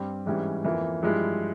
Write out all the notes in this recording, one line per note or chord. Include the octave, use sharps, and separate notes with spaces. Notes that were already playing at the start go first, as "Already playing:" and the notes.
Already playing: G2 G3 C4
G#2 E3 G3 C#4
F2 E3 A#3
G2 F3 G#3 E4